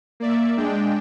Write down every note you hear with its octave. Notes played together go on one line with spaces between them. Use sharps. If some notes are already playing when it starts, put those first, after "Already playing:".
A#3 D5 E5
G#3 D4 G5